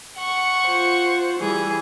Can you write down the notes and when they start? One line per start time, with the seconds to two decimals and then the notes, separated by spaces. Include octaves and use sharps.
0.17 F#5 C#6
0.67 F4 C5
1.40 E3 G3 G#4